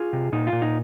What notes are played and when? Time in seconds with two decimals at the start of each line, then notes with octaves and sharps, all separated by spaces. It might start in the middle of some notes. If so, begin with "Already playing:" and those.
Already playing: F4 G#4
0.13 C3
0.32 A#2 D#4
0.47 F4
0.53 A#2
0.62 D#4